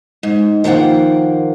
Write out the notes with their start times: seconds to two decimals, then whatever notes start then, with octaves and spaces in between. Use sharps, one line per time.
0.23 G#2
0.64 D#3 F3 A#3 F#5 G5